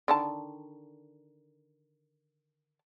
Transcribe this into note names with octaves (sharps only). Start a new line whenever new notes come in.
D3 D#3 A5